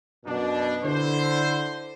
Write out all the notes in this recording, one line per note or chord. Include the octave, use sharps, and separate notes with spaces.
F#2 B2 D4
D3 E4 C5